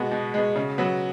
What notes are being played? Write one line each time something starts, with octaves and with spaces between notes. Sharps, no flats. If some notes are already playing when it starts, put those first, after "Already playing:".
Already playing: B2 G#3 B3 F#4
B2
G#3 B3
C#3
F#3 B3